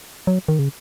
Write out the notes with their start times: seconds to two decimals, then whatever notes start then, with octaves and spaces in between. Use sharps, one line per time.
0.27 F#3
0.48 D#3
0.59 C#3